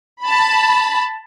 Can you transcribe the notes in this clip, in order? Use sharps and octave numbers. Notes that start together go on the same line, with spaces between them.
A5 B5